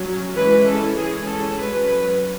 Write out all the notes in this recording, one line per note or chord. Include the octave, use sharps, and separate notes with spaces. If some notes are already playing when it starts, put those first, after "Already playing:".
Already playing: F#3 C#4
E3 G#3 C#4 B4
A4
E3 G#3 C#4 G#4
A4
F#3 C#4 B4
B4